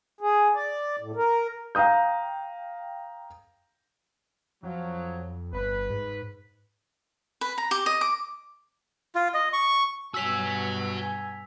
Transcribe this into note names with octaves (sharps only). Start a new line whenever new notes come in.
G#4
D5
A2
A#4
F5 G5 A#5 D#6 G6
F2 F3 F#3
G1 B4
G#2
B4
A#5
G4
D#5
D6
F4
D#5
C#6
G2 B2 F#4 C#5 G#5 E6 B6 F7